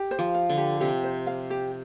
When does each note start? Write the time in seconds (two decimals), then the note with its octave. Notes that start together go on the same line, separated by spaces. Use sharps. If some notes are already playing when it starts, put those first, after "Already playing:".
Already playing: G4
0.11 C5
0.19 F3
0.34 F5
0.50 D3
0.57 G4
0.80 C3 G4
1.04 C5
1.27 F5
1.50 G4